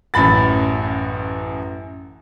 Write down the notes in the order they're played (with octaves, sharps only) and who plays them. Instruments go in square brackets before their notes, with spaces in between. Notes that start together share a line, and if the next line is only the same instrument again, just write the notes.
[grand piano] A1 F#2 B5 A6